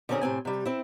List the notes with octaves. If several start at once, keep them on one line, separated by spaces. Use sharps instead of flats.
D3 F#3 C4 C#4 G#4 A#4
A2 C3 C4 G#5
C3 G3
C4 E4